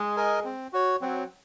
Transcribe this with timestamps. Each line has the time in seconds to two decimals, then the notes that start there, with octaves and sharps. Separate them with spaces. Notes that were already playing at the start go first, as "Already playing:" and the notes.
Already playing: G#3
0.17 A#4 D#5 G#5
0.45 C4
0.73 F#4 C#5
1.01 F#3 C4